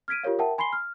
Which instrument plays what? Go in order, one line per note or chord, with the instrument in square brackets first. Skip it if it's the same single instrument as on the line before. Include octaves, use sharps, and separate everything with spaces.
[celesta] F6 G#6 B6 D7 D#7
F4 G4 A#4 C#5 F5
A#4 E5 F#5 G5 A5
G#5 B5 C6 C7 G7
F6